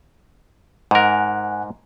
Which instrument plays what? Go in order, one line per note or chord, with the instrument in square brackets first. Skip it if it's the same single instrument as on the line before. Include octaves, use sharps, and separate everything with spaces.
[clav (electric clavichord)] G#2 A#4 [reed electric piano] F#5 G#5 F#6